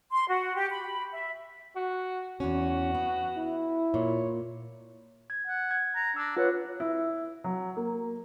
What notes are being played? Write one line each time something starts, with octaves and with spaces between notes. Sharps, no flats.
C6
F#4
G4
B5
E5
F#4
E2 C#4 F#4
B3
E4
A#2 C#5
G#6
F#5
G#6
A#5
D4 E6
F4 B4 C#5 F#5
E4
F#3
A#3